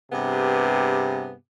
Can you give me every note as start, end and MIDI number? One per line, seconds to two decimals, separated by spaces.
0.12 1.34 43
0.12 1.34 48
0.12 1.34 59
0.12 1.34 68